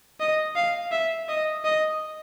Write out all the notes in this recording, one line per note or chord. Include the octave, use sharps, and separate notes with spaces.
D#5
F5
E5
D#5
D#5